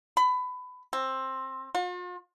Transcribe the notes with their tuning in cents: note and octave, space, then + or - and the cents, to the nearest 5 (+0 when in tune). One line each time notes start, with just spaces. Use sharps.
B5 +20
C4 +15
F4 +45